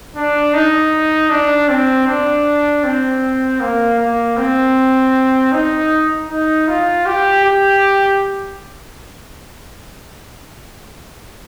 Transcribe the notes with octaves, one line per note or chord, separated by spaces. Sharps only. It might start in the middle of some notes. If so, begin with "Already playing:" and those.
D4
D#4
D4
C4
D4
C4
A#3
A#3
C4
D#4
D#4
F4
G4
G4